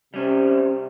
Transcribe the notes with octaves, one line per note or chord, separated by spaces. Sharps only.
C3 G3 C#4